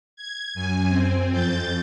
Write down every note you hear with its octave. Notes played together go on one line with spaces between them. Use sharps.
G#6
F#2 G#5
C4
F2 G6 A6